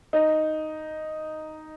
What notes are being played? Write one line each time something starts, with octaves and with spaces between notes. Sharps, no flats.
D#4